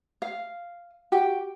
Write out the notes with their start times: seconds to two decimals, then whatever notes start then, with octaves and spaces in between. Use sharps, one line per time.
0.22 F5
1.12 F#4 G4 G5